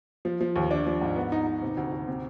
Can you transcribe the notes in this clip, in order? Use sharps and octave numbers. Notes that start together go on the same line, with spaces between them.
F3
F3
D#2
D4
F3
G#2
B3
D#4
D#4
C3
D2
D2
C3